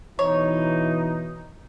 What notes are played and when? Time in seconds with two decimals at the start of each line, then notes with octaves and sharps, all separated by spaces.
0.19 B2 E3 D#4 C#5